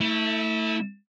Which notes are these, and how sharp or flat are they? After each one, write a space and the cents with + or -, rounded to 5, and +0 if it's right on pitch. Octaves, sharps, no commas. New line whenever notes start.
A3 +15 E4 -25